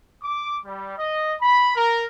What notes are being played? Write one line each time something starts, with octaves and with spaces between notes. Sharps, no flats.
D6
G3
D#5
B5
A#4